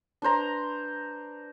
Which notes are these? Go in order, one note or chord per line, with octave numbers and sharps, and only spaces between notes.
D4 B4 C5 A#5